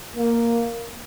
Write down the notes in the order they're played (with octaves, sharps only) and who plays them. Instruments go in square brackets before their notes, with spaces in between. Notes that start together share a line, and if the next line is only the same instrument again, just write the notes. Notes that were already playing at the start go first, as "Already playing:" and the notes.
[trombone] A#3